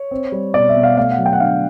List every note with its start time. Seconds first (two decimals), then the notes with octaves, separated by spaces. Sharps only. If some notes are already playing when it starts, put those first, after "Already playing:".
Already playing: C#5
0.11 C4
0.32 G3
0.54 B2 D5
0.69 E5
0.76 B2
0.83 F5
0.97 A3 F5
1.11 F#5
1.18 F#3
1.26 G5
1.33 F#5
1.40 D3 F5